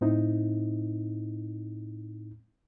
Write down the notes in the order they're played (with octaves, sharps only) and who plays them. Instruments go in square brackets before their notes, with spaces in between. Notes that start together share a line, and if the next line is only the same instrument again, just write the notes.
[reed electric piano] A2 C4 D#4 E4